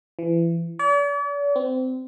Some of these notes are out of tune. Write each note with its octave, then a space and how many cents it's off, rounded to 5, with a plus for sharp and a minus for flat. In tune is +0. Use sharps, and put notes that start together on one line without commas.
E3 +30
D5 -45
C4 -25